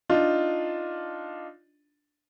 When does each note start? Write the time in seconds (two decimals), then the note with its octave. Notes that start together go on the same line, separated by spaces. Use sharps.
0.10 D4 D#4 F4